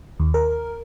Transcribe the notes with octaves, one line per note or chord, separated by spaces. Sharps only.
D#2
A#4